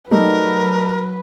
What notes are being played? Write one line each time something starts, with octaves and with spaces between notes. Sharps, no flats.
F#3 G3 A3 D#4 A#4 B4